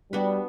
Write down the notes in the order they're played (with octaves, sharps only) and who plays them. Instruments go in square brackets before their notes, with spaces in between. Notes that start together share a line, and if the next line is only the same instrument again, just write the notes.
[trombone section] G3 [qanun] B3 D4 F#4 B4